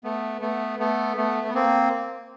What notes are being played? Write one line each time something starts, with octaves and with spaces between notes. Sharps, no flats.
A3 B3
A3 B3
A3 B3
A3 B3
B3
A#3 C4